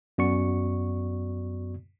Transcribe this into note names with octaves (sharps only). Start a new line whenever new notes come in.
F#2 B3 F#4 D5 C#6 C#7